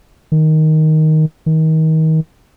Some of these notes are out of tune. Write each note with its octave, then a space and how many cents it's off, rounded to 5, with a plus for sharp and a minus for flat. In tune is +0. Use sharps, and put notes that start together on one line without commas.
D#3 +5
D#3 +30